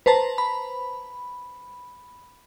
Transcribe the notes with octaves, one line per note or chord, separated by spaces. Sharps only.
B4 C5 A5 A#5
B5